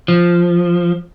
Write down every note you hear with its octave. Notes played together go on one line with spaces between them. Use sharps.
F3